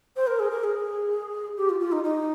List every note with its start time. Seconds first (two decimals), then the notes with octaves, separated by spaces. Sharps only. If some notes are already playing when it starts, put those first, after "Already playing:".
0.16 C5
0.27 A#4
0.39 G#4
0.50 A#4
0.63 G#4
1.57 G4
1.69 F4
1.80 F4
1.92 D#4
2.03 D#4